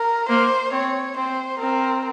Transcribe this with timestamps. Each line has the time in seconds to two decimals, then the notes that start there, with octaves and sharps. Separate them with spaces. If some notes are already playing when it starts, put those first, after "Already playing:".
Already playing: A#4
0.29 A#3 C5
0.72 C4 C#5
1.17 C4 C5
1.60 C4 A#4